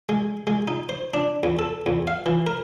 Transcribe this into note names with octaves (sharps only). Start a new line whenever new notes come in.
G#3
G#3
D#4
C5
D4
E2
A4
E2
F5
E3
A#4